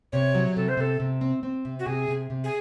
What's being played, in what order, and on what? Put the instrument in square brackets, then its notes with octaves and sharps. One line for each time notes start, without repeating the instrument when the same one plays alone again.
[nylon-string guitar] C3 [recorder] C#5
[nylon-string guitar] F#3
[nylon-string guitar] C3 [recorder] A4
[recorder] C5
[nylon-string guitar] C3 [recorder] A4
[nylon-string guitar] C3
C4
C4
C3
[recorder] F#4
[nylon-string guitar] C3 [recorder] G#4
[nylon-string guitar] C3
C3
[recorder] G#4